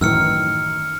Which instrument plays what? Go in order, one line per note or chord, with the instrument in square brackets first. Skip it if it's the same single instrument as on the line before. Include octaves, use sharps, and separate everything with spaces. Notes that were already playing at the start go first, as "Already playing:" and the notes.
[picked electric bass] F#2 A2 E3 [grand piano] D#3 [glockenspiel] E6 F6 C#7